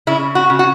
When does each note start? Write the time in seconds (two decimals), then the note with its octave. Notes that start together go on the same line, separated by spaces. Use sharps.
0.07 C#3 E4
0.35 F#4
0.50 C#3
0.59 F#4